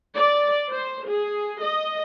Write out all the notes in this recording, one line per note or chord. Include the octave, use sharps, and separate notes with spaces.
D5
C5
G#4
D#5